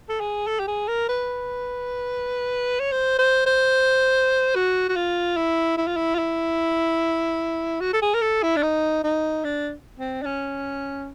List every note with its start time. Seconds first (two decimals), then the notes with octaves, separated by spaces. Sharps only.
0.09 A4
0.21 G#4
0.47 A4
0.60 G4
0.68 G#4
0.88 A#4
1.09 B4
2.80 C#5
2.92 C5
3.19 C5
3.46 C5
4.55 F#4
4.89 F#4
4.96 F4
5.37 E4
5.77 E4
5.87 F4
5.97 E4
6.15 F4
6.19 E4
7.81 F#4
7.94 A4
8.02 G#4
8.14 A#4
8.22 A4
8.43 E4
8.57 D4
8.63 D#4
9.04 D#4
9.44 D4
9.99 C4
10.22 D4
10.26 C#4